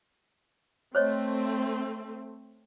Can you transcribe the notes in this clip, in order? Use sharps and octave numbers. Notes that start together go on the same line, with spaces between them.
A3 C4 C5 C#5 D#5